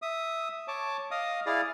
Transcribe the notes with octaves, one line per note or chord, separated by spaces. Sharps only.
E5 D#6
C#5 A5 D6
D#5 F5 D#6
E4 G#4 D5 F5